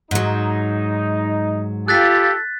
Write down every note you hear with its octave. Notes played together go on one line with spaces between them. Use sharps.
G#2 F#3 D#4
F4 G4 A4 F#6 A6 B6